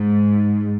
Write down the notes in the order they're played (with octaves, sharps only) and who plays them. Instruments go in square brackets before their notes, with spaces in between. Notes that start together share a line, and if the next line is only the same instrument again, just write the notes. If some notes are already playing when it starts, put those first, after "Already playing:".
Already playing: [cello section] G#2